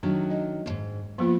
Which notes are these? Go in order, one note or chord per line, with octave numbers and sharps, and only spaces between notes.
D#3 F#3 A3 D4
D#5
E2 G#2
F3 A#3 B3 F4